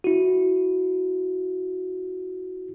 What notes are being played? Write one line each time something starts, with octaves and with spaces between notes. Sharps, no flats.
E4 F#4